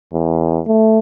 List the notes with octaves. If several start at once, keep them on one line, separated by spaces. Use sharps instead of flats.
E2
A3